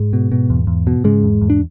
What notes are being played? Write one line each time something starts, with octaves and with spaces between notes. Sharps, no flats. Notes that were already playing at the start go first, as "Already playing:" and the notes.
Already playing: G#2 G#3
B2
B2
E2
E2
B2
G#2 C#3 G#3
E2
E2
D4